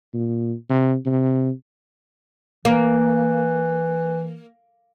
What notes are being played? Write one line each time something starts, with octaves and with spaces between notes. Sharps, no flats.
A#2
C3
C3
E3 A#3